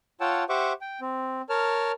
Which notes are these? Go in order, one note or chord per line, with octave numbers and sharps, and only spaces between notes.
F4 C#5 F#5 G5 A5 E6
G4 C5 E5 F#5 C#6 D6
G5
C4
A#4 C#5 A5 F6